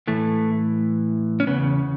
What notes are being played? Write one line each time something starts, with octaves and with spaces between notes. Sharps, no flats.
A2 E3 A3
C#4
E2 C#3 B3